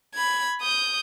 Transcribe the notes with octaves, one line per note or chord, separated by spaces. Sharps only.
B5 G#6
D#6 G6